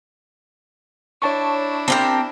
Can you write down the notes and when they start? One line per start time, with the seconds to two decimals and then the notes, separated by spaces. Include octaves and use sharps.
1.22 D4 E4 C#5 A5 C#6
1.88 C4 G4 A#4 A5